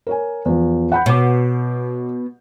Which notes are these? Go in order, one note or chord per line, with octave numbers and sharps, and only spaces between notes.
A#4 C#5 G#5
E2 F3
F#5 B5 G6
B2 C#5 D6